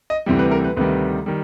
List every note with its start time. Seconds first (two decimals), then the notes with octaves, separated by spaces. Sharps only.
0.10 D#5
0.26 D2 C3 E3 G3
0.39 B4
0.51 A#4
0.64 B4
0.77 D2 C3 D#3 G3 B4
1.26 D#3 G3